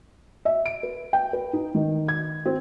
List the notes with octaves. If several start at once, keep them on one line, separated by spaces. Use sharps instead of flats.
E5
D7
B4
G5
B4
D#4
D#3
G#6
C4